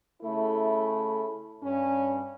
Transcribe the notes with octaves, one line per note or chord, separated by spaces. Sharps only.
C#3 A3 E4 A4
G2 C#4